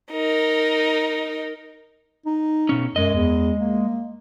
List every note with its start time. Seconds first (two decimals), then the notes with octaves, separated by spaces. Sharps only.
0.12 D#4 A#4
2.26 D#4
2.69 B2 C#4
2.96 F#2 G#3 D#5
3.14 E2
3.59 A#3